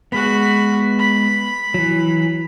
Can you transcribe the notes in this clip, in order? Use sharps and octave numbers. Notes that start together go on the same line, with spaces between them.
G#3 B3 F#4 B5
B5
E3 F#3